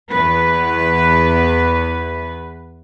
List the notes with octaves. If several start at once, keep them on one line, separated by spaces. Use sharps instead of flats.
E2 B3 B4